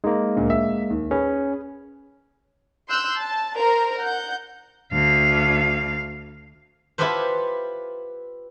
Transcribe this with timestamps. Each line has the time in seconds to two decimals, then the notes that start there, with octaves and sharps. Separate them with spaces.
0.04 G#3 A#3 D#4
0.36 D2 A#2
0.50 E5
0.90 D#2
1.11 C#4 G#4 B4
2.89 C6 E6 F#6 G6
3.19 A5
3.57 A#4 C5
4.01 F#5 G6
4.93 D2 F5
6.98 E4 F4 G4 A4 B4 C5